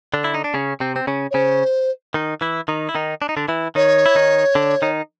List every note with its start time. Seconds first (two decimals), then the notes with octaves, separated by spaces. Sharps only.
0.14 D3 D4
0.24 E4
0.34 D#4
0.44 D4
0.54 C#3 C#4
0.80 C3 C4
0.96 C4
1.07 C#3 C#4
1.30 C#5
1.34 C#3 C#4 C5
2.14 D#3 D#4
2.41 E3 E4
2.68 D#3 D#4
2.89 E4
2.95 D#3 D#4
3.22 D4
3.29 D#4
3.37 D3 D4
3.48 E3 E4
3.75 D#3 D#4 C#5
4.06 E4
4.15 D#3 D#4
4.55 D3 D4
4.82 D#3 D#4